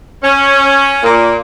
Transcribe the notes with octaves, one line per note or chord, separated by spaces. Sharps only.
C#4
A#2